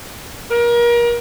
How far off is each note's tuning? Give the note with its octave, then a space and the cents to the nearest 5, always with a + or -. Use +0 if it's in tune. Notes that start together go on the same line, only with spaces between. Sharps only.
A#4 +30